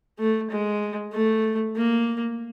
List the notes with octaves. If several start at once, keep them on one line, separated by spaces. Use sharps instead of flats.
A3
G#3
A3
A#3